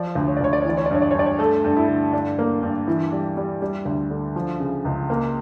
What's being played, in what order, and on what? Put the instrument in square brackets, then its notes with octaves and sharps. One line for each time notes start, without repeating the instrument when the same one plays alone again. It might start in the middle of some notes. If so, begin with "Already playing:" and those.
Already playing: [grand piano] F3 D5
D2
C#5
D5
D2 C#5
D5
C#5
E3 D5
C#5
D5
G2 C#5
D5
C#5
G2 D5
C#5
A3 A4
G2
E4
D3
G2 D4
A#3
G2
E3 E4
G3
G3
G3
D2
D3
F3
C#3
C#2
A#3